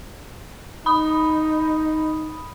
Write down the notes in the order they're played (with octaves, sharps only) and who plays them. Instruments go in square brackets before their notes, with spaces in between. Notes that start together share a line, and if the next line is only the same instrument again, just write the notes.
[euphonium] D#4 [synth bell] B5 D#6